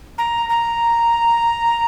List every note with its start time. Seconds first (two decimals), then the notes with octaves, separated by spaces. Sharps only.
0.18 A#5
0.49 A#5